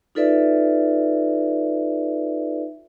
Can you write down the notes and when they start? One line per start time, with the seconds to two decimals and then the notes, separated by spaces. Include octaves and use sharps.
0.15 D#4 F4 A4 B4 D5 E5